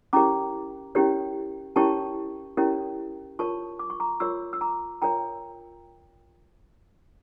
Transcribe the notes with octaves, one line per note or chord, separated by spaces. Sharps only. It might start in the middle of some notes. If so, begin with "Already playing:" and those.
C#4 E4 G4 A#4 C#5 A#5 D6
C#4 E4 G4 A#4 C#5
C#4 E4 G4 A#4 C#5 A5 C#6
C#4 E4 G4 A#4 C#5
F4 A#4 C#5 A5 C#6
D6
C#6
A#5 D6
F4 A#4 C#5 C#6 E6
E6
A#5 D6
F4 A#4 C#5 G5 A#5